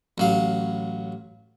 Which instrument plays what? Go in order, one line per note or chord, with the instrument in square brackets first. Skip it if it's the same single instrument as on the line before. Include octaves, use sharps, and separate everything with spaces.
[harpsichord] A1 F#3 F5